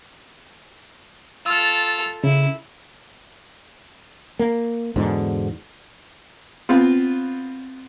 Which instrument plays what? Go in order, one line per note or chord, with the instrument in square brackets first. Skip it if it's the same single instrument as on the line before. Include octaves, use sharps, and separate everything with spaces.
[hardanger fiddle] F4 A4 [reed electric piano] E6 F6
[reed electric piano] C#3 [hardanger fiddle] E4
[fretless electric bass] A#3
E2 G#2 B2 D3
[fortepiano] B3 C4 F4